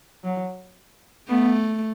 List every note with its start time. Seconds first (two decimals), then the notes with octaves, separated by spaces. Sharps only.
0.24 F#3
1.29 A3 B3